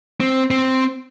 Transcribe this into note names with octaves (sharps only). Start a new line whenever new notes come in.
C4
C4